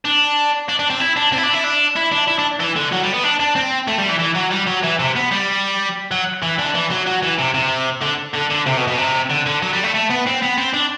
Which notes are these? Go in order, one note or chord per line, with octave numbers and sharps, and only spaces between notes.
D4
D4
D4
C4
E4
D4
C4
E4
D4
E4
D4
E4
D4
E4
D4
E3
D3
F#3
G3
B3
D4
D4
C4
A3
G3
E3
E3
F#3
G3
F#3
E3
C3
B3
G3
F#3
E3
D3
E3
F#3
F#3
E3
C3
C3
D3
D3
D3
C3
B2
B2
C3
D3
D3
F#3
G3
A3
A3
B3
C4
B3
C4
D4